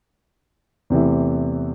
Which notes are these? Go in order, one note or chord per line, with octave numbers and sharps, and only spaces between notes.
E2 C3 E3 A3